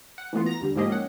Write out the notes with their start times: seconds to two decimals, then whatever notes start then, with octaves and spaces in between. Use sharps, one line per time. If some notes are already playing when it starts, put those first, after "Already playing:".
0.18 F#5
0.33 E3 A3 B3 F4
0.46 A#5 A#6
0.61 D#2 D3 G3
0.76 G#2 F3 A#3 G4 G#4 D#5
0.90 C#4 F#5